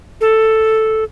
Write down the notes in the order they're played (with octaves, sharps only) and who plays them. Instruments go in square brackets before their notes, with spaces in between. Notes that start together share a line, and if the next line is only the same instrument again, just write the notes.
[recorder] A4